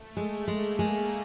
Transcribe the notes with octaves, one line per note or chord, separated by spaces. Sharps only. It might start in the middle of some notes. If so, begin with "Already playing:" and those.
Already playing: A3
G#3
G#3 A#3
G#3